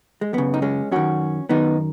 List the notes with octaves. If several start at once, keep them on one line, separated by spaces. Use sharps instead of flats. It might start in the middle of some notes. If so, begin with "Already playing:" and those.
G#3
F#2 C#3 B3
D#4
G#3 C#4
F#2 D#3 C#4 F#4
F#2 D#3 B3 D#4